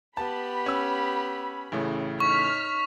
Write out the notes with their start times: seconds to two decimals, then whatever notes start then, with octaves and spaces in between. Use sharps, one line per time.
0.17 B3 G4 A5 B5
0.66 C#4 E6
1.72 A1 A2 C#3
2.20 D#4 C#5 C#6 F6 B6